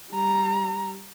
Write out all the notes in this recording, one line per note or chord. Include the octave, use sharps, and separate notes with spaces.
G3 A#5